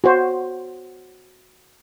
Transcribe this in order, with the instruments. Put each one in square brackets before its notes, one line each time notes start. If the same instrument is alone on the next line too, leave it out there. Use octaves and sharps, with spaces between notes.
[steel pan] F#4 C5